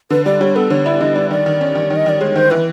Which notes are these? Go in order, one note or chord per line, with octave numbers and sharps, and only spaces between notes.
D3 B4
G3 D5
G3 C#5
B3 A4
D3 C#5
E4 D5
D3 D#5
G3 D5
D#3 D5
D#3
C#4
D#3
D#3
D#5
D#3 D5
G#3 C#5
D#3 C5
E3 B4